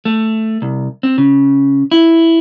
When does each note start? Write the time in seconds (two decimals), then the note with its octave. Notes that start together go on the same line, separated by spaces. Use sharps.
0.05 A3
0.62 C2
1.03 C4
1.18 C#3
1.92 E4